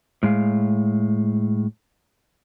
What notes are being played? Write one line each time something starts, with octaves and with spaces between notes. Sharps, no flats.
A2 G#3 F5